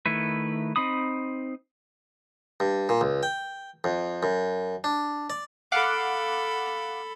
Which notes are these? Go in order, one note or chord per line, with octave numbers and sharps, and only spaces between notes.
D#3 A3 E4 B4
C4 D#4 B5 D#6
G2
A#2
C#2
G5
F2
F#2
D4
D5
A4 F5 F#5 B5 D6